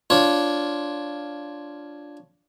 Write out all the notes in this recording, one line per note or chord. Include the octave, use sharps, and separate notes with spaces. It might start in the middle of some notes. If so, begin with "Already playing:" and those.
D4 F4 C#5